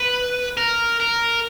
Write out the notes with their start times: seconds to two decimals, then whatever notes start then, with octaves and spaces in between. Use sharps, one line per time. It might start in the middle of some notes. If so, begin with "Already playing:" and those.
Already playing: B4
0.57 A#4
1.00 A#4